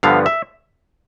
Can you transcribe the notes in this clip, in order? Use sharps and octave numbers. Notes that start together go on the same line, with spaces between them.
G2 D3 F3 B3 F5
E5